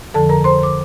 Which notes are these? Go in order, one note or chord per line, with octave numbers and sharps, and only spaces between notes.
F2 D3 F3 A4 A5
A#4 A#5
C5 C6
D6